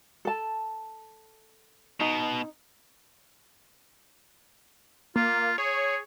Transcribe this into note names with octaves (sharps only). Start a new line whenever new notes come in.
A4 A5
B2 D#4
A#3 F4
G#4 C#5